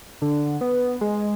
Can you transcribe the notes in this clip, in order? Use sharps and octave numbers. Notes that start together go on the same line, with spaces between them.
D3
B3
G#3